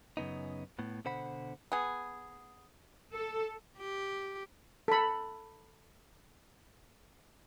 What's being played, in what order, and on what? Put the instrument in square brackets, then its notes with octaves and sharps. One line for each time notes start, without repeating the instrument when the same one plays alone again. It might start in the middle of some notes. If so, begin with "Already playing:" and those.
[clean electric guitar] F#2 C#3 B3 D#4
A2 B3
B2 D3 C5 F#5 B5
[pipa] B3 G#4
[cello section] A4
[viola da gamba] G4
[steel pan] A4 B5